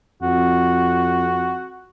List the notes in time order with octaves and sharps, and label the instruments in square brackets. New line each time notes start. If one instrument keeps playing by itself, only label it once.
[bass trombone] F2 [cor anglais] F#4